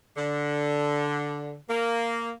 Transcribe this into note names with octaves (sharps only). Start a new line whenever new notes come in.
D3
A#3